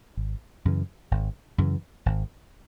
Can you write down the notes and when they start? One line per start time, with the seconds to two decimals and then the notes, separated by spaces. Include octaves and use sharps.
0.17 G#1
0.65 F#2 C#3 E3
1.11 G#1
1.58 F#2 C#3 E3
2.06 G#1